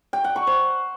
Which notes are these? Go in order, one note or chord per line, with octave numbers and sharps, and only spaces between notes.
G5
F#5
C#6
C5